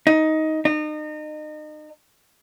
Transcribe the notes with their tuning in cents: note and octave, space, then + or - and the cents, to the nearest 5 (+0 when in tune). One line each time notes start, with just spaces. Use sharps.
D#4 +15
D#4 -35